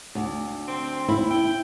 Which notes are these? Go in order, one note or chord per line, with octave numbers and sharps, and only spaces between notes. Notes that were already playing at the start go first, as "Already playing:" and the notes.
D2
C4
E4
G5